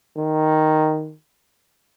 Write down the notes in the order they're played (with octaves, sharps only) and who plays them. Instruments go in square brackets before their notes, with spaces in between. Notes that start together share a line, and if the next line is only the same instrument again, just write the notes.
[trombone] D#3